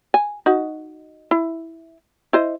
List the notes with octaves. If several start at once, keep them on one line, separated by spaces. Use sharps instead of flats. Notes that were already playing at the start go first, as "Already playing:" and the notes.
G#5
D#4 F#4
E4
E4 C5 D#5